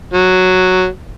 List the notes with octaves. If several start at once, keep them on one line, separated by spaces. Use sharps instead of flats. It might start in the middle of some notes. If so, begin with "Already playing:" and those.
F#3